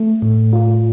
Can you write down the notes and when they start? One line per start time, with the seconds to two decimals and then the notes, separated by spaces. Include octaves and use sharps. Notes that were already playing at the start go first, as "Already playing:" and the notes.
Already playing: A3
0.22 A2
0.53 F4